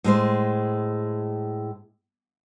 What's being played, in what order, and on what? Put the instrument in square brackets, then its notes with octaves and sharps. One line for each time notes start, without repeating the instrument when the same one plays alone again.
[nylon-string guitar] A2 G#3 C5